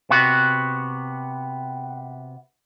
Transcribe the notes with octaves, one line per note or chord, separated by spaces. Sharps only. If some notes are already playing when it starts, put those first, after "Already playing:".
C3 B3 F#4